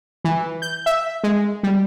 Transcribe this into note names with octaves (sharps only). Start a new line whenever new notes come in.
E3
G6
E5
G#3
G3